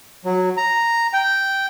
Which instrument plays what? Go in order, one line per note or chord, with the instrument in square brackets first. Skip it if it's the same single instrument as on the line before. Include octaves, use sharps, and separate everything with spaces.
[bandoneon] F#3
A#5
G5